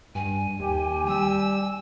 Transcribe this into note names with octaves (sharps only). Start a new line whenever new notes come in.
G2 G#5
D#2 G4
G3 E6